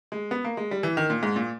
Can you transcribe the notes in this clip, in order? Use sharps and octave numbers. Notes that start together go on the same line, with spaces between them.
G#3
B3
A#3
G#3
G3
E3
D#3
A#2
G#2
A#2